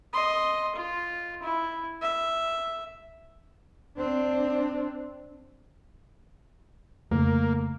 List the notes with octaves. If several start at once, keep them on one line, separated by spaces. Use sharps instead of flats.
D#5 C6
F4
E4
E5
C4 D4
F2 C#3 A3 A#3